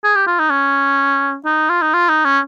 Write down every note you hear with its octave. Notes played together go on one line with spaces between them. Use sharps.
G#4
G4
F4
D#4
C#4
D#4
F4
D#4
F4
D#4
C#4